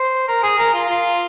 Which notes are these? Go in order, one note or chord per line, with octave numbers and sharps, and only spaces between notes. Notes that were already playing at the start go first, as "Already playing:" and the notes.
Already playing: C5
A#4
G#4
A#4
F4
F4